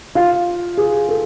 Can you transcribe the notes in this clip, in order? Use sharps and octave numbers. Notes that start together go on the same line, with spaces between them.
F4 F5
G#4
A4